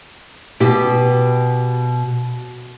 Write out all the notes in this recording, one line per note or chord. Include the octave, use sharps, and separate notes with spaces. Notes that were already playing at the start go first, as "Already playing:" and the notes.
B2 G4